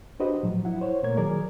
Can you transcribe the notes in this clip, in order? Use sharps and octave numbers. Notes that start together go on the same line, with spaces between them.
D4 F#4 G4 B4 C5 D#5
A2 F3 F#3
E4 F#5
C5 C#5
A#2 A3 A#3 A#4 C#5 G#6
D#3 F#3 G#4 A#4 D5